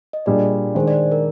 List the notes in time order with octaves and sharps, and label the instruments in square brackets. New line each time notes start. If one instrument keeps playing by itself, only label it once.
[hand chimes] D#5
[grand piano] A#2 G3 D4 G#4 [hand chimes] D5
[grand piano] D#3 G#3 D4 [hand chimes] C5
[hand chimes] D5
A#4